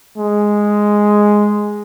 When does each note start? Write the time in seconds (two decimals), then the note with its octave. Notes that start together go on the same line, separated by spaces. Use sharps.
0.18 G#3